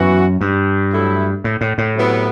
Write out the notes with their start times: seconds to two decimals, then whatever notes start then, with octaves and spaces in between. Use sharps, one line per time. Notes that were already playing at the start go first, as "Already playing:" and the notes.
Already playing: F#2 E3 B3 F#4
0.41 G2
0.92 A2 F#3 A3 E4
1.44 A2
1.61 A2
1.78 A2
1.95 C3 F#3 B3 E4